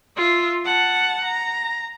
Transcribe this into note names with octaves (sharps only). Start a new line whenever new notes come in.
F4 E5
F#5 A5
A#5